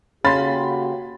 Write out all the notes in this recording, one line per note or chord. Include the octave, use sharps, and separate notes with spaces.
C#3 A#3 F#4 G4 B5 C6 A6